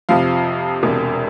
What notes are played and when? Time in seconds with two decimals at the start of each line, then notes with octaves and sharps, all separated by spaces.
0.09 F2 C3 F3 F5
0.83 E1 E2 C3